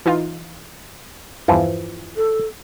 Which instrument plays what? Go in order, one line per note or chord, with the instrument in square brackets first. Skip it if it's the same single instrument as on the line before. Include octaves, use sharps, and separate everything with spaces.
[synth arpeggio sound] E3 D#4 F4
[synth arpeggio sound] E2 G2 [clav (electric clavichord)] E3 F3
[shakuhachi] A4